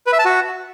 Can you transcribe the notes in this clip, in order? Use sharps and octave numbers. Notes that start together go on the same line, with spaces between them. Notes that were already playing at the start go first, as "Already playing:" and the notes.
B4
E5
A5
F#4